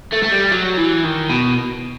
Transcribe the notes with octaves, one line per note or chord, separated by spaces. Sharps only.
A3
A3
G3
F#3
E3
D#3
B2